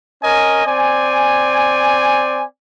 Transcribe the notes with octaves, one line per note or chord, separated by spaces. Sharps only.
C#4 A#4 D#5 G#5
C4 D5 G#5